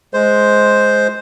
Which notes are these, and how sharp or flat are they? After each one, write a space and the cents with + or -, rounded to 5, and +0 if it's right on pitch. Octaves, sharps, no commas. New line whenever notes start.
G#3 +10 C5 +0